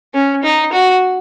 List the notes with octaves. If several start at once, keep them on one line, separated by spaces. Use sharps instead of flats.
C#4
D#4
F#4